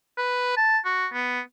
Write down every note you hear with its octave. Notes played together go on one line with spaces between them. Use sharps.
B4
A5
F#4
B3